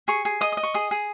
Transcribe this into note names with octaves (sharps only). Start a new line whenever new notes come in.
G#4 C#6
G#4
D#5 D#6
D#5 D#6
C#6
G#4 D#6
G#4